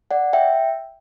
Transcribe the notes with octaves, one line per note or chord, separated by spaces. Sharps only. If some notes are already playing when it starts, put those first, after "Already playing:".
D5 F#5
E5 G5